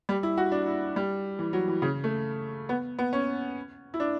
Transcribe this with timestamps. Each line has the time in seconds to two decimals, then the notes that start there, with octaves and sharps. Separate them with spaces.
0.09 G3
0.23 E4
0.37 F#4
0.52 D4
0.67 E4
0.96 G3
1.39 E3
1.53 F#3
1.68 E3
1.82 C#3
2.04 A3
2.69 B3
2.99 B3
3.13 C#4
3.94 E4
4.00 D4